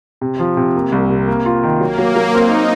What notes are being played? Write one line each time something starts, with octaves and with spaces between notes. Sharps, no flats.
C3
F3
C3
A#3
C2
C3
A#3
F4
D#3
F#3 A#3
F#3
F#3
C4 D#4